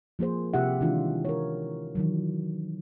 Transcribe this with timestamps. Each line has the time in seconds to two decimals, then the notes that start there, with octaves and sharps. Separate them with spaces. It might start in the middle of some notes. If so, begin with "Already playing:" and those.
0.19 F3 A#3 G#4 C5
0.54 C3 F4 G4 E5 F#5
0.81 D#3 E3 G#3 D4 E4 F4
1.25 A#4 C#5
1.95 D#3 E3 F#3